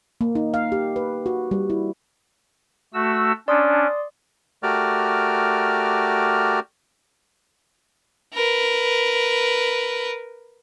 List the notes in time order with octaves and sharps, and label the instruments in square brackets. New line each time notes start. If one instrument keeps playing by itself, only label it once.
[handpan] A#3
D#4
F5
G4
B4
F#4
G3
E4
[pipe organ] A3 F#4 E6
[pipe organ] C#4 D4 [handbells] D5 C6 D#6
[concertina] A3 F#4 G4 A#4 D5 F6
[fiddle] A#4 B4